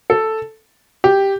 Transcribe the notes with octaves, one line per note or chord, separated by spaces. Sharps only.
A4
G4